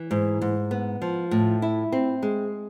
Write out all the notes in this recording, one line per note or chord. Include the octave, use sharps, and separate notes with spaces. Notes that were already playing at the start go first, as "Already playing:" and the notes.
Already playing: E3
G#2
G#2
B3
F3
A2
E4
C4
G#3